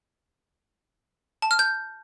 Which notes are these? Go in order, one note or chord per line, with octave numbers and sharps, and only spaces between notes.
A5
F6
G6